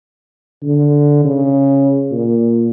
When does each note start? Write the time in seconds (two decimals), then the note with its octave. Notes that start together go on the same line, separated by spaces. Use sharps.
0.63 D3
1.25 C#3
2.12 A#2